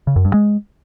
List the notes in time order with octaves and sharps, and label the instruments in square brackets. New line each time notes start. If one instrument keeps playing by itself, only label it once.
[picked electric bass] C#3
F#2
G2
G#3